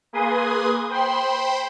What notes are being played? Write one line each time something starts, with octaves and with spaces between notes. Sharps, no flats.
A#3 G#4 B4 G#5 C6 D#6
C5 G5 B5 C6